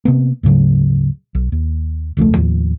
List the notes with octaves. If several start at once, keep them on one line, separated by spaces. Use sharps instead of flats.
C3 A#3 B3
D2 G#2 C#3 F#3
B1
D#2
E1 C#2 F3 A3
D#2 A2 F3